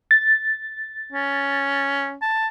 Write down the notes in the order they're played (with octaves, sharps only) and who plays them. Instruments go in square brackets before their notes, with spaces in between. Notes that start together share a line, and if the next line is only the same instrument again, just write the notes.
[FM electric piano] A6
[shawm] C#4
A5